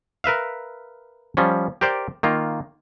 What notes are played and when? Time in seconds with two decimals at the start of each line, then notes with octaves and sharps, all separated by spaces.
0.24 A#4 B4 E5 F5
1.37 F3 G3 C#4
1.81 G4 A#4 C5 D5 G5
2.23 D#3 A#3 F4